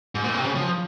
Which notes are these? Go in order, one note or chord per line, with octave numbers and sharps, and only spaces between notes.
G#2
A#2
C3
C#3
F3